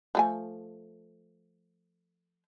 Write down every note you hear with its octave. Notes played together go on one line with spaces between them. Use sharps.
F3 A3 G#5